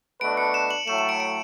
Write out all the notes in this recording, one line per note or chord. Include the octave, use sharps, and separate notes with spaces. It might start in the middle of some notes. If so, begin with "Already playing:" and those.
B2 A3 D4 F#4 B4 D7
C#7
E7
F#7
A2 F#3 A3 E7
E7
D7
D7